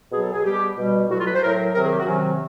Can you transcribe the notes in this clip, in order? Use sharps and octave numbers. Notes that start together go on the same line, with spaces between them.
B2 F#3 G#4
A4
G#4
B2 G3 G4
B2 G3
A2 F#3 F#4
F4
B4
C5
A2 F#3 A#4
C3 D#3 F#3 A#4
G#4
G4
F#4
C3 D#3 F#3 C#4